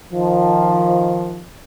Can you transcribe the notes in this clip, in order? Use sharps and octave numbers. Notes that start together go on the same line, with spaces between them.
D#3 F3